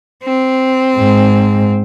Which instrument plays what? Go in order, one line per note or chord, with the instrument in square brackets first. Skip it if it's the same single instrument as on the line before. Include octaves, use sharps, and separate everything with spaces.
[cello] C4
[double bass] G#2